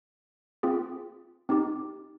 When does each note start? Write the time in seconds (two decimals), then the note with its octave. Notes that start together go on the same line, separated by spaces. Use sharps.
0.63 C4 F4 G#4
1.49 C4 D#4 G4